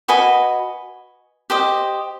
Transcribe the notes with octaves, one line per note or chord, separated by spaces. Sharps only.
F#4 B4 D#5 G#5
G4 C5 D#5